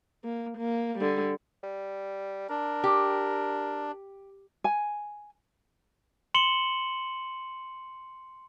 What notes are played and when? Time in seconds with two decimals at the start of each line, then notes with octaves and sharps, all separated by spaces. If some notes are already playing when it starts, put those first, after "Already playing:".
0.24 A#3
0.58 A#3
0.99 D3 G3
1.63 G3
2.50 D4 A#4
2.84 G4
4.64 G#5
6.34 C6 C#7 E7 F#7 G7